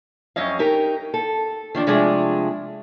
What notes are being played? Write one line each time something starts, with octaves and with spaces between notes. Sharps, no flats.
F2 F#3 C#4 D#5 F5
D#4 G4 A#4
A4
D#3 F3 D4
C3 F3 G#3 A3 D4 G#4